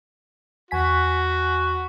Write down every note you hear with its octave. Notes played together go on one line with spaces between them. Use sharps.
E2 F#4 G#5 B6